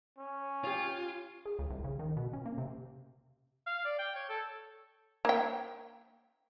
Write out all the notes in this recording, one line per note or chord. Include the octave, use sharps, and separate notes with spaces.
C#4
F4 G4 C#5
G#4
C#2
C2
C#3
D#3
B2
C#4
A#3
C3
F5
D5
G5
C#5
A4
A#3 G5